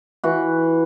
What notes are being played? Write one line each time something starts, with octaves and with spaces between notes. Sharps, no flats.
E3 F#4